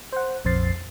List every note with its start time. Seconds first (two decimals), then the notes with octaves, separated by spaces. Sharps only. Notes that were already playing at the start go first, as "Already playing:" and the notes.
0.12 C5 F#5
0.45 A#1 F2 C5 A6 C7